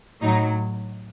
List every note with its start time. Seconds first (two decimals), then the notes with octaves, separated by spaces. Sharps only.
0.22 A2 F#3 D#4